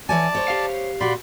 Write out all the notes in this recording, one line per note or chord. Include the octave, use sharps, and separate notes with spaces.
E3 C#5 D5 G#5 A5
C5 C#5
G4 F5
A#2 F#4 D5 B5 C6